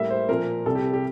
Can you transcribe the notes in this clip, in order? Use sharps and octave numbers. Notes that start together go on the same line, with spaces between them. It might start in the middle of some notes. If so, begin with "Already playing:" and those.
Already playing: A2 G3 A#3 E5
C5
A#2 F3 A#3 A#4
C2 C3 G3 A4
G4
G4